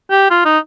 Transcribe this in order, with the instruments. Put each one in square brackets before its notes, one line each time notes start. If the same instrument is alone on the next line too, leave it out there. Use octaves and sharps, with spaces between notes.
[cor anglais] G4
F4
D#4